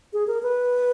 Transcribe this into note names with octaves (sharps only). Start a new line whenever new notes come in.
G#4
A#4
B4